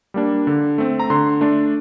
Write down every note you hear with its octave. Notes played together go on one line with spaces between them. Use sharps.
G3 A#3 D4
D3
A3 C4
A#5
D3 C6
A3 D4